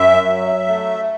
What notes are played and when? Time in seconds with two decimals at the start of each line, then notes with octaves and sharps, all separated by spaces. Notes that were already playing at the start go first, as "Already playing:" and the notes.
Already playing: F#2 E5
0.24 F#3
0.67 A3